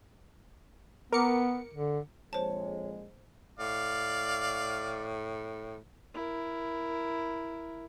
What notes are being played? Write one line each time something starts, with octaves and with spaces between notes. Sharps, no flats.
B3 A#4 D6 C#7
D3
A#1 F2 G#3 C5 C#5 A5
A2 D5 F5
E4 A#4